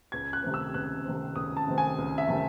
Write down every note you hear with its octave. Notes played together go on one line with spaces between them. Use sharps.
C#2 G#6
F#6
C3 D#3 A3 C4
E6
C#2 F#6
C3 D#3 A3 C4
C#2 D#6
A5
C3 D#3 A3 C4
G#5
C#2
E5
C3 D#3 A3 C4